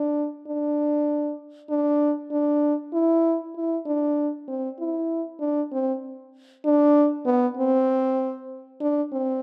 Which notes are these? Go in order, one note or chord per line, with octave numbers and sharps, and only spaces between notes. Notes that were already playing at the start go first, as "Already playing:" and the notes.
Already playing: D4
D4
D4
D4
E4
E4
D4
C4
E4
D4
C4
D4
B3
C4
D4
C4